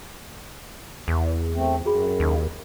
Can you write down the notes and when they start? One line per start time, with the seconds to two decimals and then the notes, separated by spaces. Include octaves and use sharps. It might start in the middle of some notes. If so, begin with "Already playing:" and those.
1.08 E2
1.55 A3 C4
1.85 F#2 F#4 G#4 B5
2.20 D#2